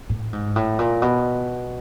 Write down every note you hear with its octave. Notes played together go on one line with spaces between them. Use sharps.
A2
G#2
A2
A#2
B2